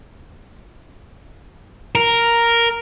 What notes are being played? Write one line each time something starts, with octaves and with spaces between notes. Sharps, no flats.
A#4